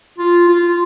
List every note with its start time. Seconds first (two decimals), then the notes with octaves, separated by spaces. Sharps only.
0.18 F4
0.49 F4